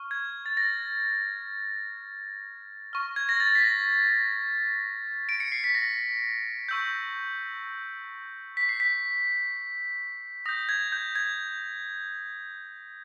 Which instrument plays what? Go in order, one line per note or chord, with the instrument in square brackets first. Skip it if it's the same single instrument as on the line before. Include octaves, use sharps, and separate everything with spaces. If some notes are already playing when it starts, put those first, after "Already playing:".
Already playing: [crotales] C#6 F6
G#6
A6
A#6
C#6 F6
G#6
A#6
A6
B6
A#6
D7
C#7
C7
B6
A#6
C#6 E6 G6
B6
C7
B6
D#6 G6 A#6
G#6
G6
G#6